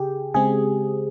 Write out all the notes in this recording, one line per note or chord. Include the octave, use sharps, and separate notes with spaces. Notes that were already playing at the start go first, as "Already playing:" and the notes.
Already playing: C#3 G4 G#4
C#3 G#3 C4 G#4